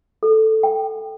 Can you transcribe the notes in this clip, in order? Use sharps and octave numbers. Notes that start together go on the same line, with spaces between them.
A4
G5